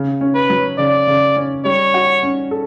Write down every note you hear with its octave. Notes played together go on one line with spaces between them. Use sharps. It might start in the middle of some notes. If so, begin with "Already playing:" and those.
Already playing: C#3
C#4
B4
F#3
C#3 D5
C#3
C#4
G3 C#5
F#4
C#4
A4